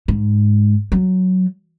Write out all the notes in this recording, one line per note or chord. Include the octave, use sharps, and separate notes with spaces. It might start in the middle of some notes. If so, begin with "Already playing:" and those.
G#2
F#3